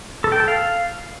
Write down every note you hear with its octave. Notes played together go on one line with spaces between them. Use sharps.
A4
G5
A4
F5